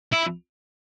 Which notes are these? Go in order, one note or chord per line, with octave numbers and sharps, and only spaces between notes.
E4